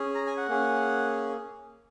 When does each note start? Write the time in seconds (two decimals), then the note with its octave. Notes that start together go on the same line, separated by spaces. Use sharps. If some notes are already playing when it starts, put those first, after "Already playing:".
Already playing: C#4 G#4
0.15 A#5
0.26 G#5
0.37 F#5
0.49 A#3 C#4 G#4